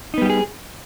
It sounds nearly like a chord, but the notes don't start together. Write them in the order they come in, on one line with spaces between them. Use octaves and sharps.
D#4 B3 G3 G4 G#4